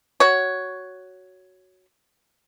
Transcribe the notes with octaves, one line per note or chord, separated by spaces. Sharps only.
F#4 C#5